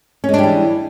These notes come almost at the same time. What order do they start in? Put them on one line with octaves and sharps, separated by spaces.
C#4 G#3 D4 G3 E3